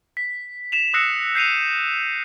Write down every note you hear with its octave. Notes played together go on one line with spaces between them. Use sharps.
B6
B6 E7 F7
D#6 E6 F#6 A#6 C7 C#7
G6 C7 D#7 F7